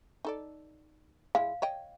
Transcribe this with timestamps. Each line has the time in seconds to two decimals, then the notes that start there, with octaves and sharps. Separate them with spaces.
0.25 D#4 A4 D5
1.35 G#3 E4 F5
1.62 C#5 D#5 G5